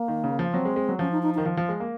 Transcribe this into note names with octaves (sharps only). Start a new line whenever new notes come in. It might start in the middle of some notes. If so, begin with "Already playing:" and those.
Already playing: A#3
D#3
C#3
F3
F#3 C4
G#3
G#3
F#3
F3 C#4
D#4
D#4
D#3 D#4
F3
F3
G#3
A#3